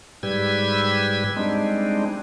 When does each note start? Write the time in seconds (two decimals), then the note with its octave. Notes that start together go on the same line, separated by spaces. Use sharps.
0.23 G#2 G3 G4 B4 E6 G#6
1.37 G3 G#3 C4 D4 D#4